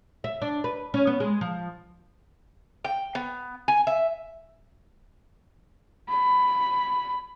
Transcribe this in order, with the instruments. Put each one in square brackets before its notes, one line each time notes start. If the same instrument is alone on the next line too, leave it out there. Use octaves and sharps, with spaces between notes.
[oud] E5
D4
B4
C#4
B3
G#3
F3
[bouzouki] G5
B3
G#5
E5
[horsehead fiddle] B5